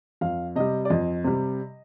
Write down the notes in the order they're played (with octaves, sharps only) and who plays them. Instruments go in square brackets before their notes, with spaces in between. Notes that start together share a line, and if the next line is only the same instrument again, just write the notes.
[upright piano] F2 F5
C3 G3 D#5
D5
F2 D#5
C3 G3